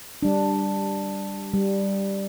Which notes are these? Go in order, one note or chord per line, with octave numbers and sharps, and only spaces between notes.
G3 D4
G3